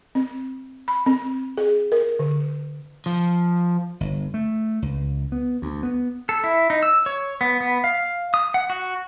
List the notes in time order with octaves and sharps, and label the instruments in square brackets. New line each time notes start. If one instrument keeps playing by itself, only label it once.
[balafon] C4
B5
C4
G#4
A#4
D3
[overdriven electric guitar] F3
[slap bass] G1
A3
C#2
B3
D2
B3
[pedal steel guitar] A4
E4
D#4
E6
C#5
B3
B3
F5
D#6
F#5
F#4